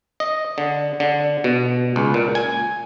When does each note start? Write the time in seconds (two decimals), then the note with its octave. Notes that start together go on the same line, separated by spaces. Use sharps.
0.20 D#5
0.58 D3
1.00 D3
1.44 B2
1.96 C#2
2.14 A#2
2.35 G#5